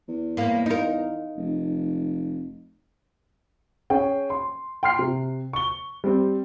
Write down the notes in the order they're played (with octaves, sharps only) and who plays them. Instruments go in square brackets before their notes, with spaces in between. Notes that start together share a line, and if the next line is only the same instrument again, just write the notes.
[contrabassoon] E2
[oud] A2 A#3
D#4 A#4
[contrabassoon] F1
[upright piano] C#4 G#4 G5
C6
G5 C6 F6 C7
C3
C#6 G7
G3 C4